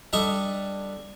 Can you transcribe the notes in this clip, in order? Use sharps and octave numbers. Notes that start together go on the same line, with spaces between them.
G3 D4 A4 D#5 E5